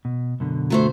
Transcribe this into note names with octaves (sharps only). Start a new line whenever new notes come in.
B2
F#2 B2 D3
F#3 A3 C5